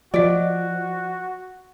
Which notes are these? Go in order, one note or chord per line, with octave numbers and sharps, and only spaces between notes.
F3 F4 F#4 D5 D#5